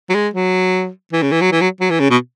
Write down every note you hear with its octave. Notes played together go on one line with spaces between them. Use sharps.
F#3
G#3
F#3
E3
C#3
E3
F#3
E3
F#3
F#3
E3
C#3
B2